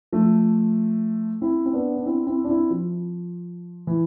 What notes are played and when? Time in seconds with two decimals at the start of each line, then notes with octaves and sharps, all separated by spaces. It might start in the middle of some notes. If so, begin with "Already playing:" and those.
0.12 F3 A3
1.41 C4 E4
1.66 C4
1.73 B3 D4
1.96 D4
2.06 C4 E4
2.27 C4 E4
2.44 D4
2.49 C4 E4
2.70 F3
3.87 E3